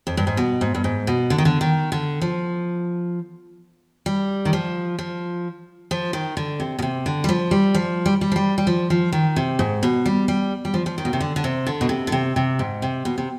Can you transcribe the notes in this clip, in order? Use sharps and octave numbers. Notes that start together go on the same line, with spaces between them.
F2
G2
G#2
B2
G#2
G2
G#2
B2
D3
D#3
D3
D#3
D3
F3
G3
D#3
F3
F3
F3
D#3
D3
C3
B2
C3
D3
G3
F3
G3
F3
G3
G3
F3
G3
G3
F3
F3
D#3
C3
G#2
B2
G3
G3
G3
F3
F3
D#3
B2
C3
D3
D3
C3
D3
B2
C3
D3
C3
C3
G#2
C3
B2
C3